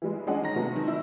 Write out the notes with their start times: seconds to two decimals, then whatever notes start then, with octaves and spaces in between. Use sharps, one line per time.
0.02 E3 G3 G#3
0.27 G#3 C#4 D4 G#4 D#5 F#5
0.42 D#3 A#5 A#6
0.56 C3 F#3 G#3 A3 B3
0.76 D#3
0.88 E4 E6